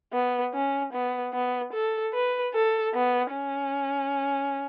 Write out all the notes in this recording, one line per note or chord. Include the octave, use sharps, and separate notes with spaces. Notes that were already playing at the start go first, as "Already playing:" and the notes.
B3
C#4
B3
B3
A4
B4
A4
B3
C#4